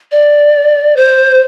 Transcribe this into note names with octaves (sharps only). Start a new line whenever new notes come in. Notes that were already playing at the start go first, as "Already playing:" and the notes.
D5
C5